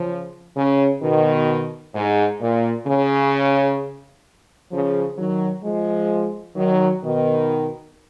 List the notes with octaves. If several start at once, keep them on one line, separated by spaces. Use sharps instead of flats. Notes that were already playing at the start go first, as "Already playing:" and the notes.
Already playing: C#3 F3
C#3
B2 D#3
G#2
A#2
C#3
C#3 F3
D#3 F#3
F3 G#3
D#3 F#3
B2 D#3